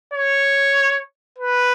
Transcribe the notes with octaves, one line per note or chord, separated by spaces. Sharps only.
C#5
B4